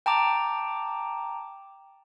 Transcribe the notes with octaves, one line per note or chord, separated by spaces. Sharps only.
G5 A5 A#5 D6